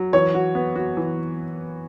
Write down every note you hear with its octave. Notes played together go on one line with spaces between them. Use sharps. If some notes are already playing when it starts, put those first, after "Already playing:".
Already playing: F#3
E3 C#5
F#4
B3
F#4
E3